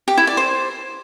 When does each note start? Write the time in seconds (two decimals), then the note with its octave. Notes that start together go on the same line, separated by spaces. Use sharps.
0.08 G4
0.17 E4
0.27 D5
0.37 C5